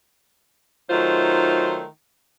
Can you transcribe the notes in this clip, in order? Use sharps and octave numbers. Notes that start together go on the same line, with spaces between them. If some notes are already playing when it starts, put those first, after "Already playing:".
D#3 F#3 A3 D#4 F4 C5